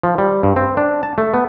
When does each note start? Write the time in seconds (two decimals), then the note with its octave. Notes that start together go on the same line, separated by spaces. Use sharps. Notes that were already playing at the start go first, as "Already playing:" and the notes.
0.03 F3
0.18 G3
0.43 G2
0.56 C4
0.77 D4
1.03 A5
1.18 A3
1.34 B3